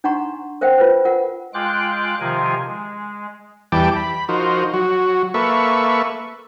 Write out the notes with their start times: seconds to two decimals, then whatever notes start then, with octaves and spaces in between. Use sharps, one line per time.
0.04 D4 D#4 F#5 A#5 C6 C#6
0.61 A#4 C5 E5 F#5 G5
0.78 F4 B4 C5
1.05 F4 A#4 F#5
1.54 G#3 F4 G5 D6 F#6
2.20 C3 D#3 F3 F4 A#4 G#5
2.67 G#3
3.72 E2 E3 G3 G5 A5 D6
3.96 B5
4.29 F3 D#4 F#4 A#4 C5
4.74 F#3 F#4
5.34 A#3 A4 B4 E5 C#6